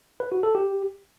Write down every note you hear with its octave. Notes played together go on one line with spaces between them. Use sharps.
B4
F#4
A4
G4